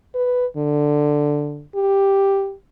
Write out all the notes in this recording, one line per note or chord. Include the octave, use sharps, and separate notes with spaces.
B4
D3
G4